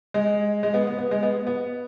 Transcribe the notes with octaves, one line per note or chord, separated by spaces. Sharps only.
G#3
G#3
B3
B3
B3
G#3
B3
B3